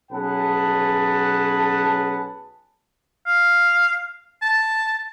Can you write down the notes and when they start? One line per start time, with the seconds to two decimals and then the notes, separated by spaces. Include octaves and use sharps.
0.12 B1 C#4 G#4 B4 F#5 A5
3.26 F5
4.42 A5